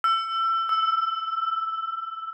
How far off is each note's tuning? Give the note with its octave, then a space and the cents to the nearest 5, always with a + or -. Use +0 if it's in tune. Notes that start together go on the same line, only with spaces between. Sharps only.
E6 +25
E6 +0